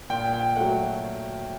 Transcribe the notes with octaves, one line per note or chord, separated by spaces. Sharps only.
A#2 G5
G5
F#3 A3 F#5